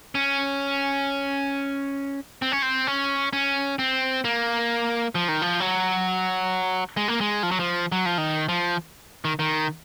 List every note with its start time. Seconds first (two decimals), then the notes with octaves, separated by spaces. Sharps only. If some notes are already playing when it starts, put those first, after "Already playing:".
0.15 C#4
2.42 C4
2.52 C#4
2.62 C4
2.87 C#4
3.33 C#4
3.79 C4
4.24 A#3
5.15 F3
5.28 D#3
5.42 F3
5.60 F#3
6.97 G#3
7.08 A#3
7.21 G#3
7.43 F3
7.51 F#3
7.59 F3
7.92 F#3
8.06 F3
8.18 D#3
8.49 F3
9.25 D#3
9.39 D#3